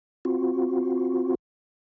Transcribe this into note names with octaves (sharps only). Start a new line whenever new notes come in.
C4 F4 F#4